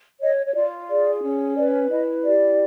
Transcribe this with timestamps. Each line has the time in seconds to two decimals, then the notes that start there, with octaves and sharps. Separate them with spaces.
0.21 C#5 D#5
0.46 C#5
0.54 F4 D5
0.88 G#4 D5
1.23 C#4
1.56 B4 D5
1.90 E4 D#5
2.24 G4 D5